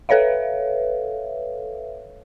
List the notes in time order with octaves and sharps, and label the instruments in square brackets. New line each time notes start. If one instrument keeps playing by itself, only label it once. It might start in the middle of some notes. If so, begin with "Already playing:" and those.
[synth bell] A4 B4 C#5 E5 F5